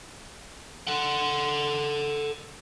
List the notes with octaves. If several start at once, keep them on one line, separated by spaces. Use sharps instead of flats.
A4 F#5